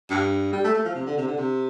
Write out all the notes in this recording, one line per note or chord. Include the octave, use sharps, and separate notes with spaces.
G2
G3
A3
A3
F3
C3
D3
C3
D3
C3